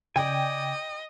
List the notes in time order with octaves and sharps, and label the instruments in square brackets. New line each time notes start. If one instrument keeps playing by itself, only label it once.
[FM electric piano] C#3 [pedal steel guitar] D5 G#5 [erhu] D#5 [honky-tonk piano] G5